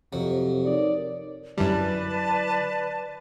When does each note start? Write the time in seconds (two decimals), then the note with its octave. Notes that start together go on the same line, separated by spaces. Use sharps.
0.13 F2 C3 F#3
0.64 D#4 A#4 C#5 D5
1.58 F#2 D3 F#3 G3 E4 B4 D5 A5